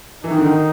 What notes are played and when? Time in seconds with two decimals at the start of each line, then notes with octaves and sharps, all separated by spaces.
0.24 E3 D#4
0.31 D#3
0.38 D3
0.45 D#3